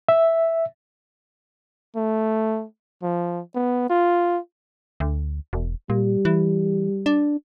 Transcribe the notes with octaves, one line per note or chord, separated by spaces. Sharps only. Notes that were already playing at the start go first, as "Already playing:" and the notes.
E5
A3
F3
B3
F4
D2
E1
A#2 G3
E3
D4